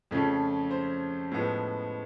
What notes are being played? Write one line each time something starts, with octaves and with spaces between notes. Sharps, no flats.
F2 C#3 F3 A3 C#4
C5
A2 F3 G#3 B3